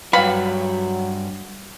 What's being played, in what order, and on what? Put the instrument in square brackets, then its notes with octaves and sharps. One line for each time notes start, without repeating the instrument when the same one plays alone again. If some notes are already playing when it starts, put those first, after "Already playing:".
[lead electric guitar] G2 F#4 [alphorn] F#3 [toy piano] B4 F5 G5 [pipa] B5